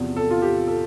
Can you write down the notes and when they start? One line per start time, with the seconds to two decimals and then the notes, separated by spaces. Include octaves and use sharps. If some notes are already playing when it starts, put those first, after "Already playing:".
Already playing: E2 C3 F3
0.16 A4
0.31 F4
0.42 G4
0.68 A4